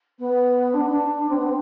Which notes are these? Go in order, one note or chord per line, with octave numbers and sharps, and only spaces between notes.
B3
D4
D4
C4
B3
C4